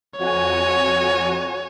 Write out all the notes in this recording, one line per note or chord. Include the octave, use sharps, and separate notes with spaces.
F2 F#4 C#5 G#5